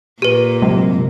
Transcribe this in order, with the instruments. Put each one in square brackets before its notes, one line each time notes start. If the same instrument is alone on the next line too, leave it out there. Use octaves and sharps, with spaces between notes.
[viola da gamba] A#2 [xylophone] G4 B4
[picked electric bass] G1 F#3 G#3 [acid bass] C3